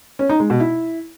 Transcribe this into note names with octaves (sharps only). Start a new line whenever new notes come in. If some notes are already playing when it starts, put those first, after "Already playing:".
C#4
D#4
G#3
B2
E4